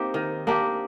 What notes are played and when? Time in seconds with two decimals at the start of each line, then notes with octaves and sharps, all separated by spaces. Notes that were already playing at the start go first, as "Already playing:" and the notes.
Already playing: A#3 C4 D#4 G4
0.14 D#3
0.47 A#3 D4 G4